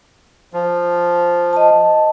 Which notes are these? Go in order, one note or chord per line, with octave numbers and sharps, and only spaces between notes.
F3
D#5 A5